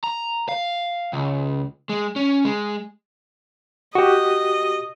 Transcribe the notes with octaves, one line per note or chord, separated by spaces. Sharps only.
A#5
F5
C#2
G#3
C#4
G#3
F#4 G4 D#5